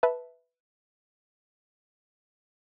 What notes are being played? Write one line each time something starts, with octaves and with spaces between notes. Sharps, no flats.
B4 E5 A5